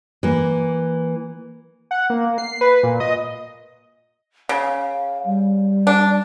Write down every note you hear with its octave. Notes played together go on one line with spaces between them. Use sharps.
E3 A#3
F#5
A#3
C7
B4
A#2
D#5
C#3 F5
G3
D4